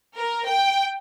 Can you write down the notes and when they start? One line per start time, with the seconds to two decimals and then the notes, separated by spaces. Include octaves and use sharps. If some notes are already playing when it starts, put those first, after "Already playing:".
0.18 A#4
0.48 G5